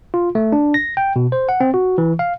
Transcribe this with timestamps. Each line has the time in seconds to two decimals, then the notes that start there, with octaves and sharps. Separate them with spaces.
0.14 F4
0.35 A3
0.52 D4
0.74 A#6
0.97 G5
1.16 B2
1.32 C5
1.49 F#5
1.61 C4
1.74 F#4
1.98 E3
2.19 F5